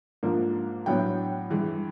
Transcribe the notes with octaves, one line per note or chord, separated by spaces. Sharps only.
G#2 F3 A#3 D4
A2 F#3 B3 D4 G5
G2 E3 G#3